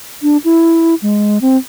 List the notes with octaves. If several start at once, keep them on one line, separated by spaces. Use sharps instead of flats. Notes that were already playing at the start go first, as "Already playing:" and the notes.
D4
E4
G#3
C4